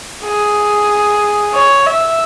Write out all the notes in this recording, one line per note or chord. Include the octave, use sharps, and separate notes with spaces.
G#4
C#5
E5